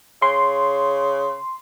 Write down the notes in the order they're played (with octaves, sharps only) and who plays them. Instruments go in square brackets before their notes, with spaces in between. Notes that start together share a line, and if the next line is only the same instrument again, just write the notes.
[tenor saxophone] C#3 [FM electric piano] C6